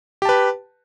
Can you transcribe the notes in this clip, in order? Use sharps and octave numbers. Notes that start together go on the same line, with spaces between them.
G4 B4 A5